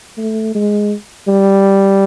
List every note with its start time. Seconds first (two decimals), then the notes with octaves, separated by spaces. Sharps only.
0.17 A3
0.55 G#3
1.28 G3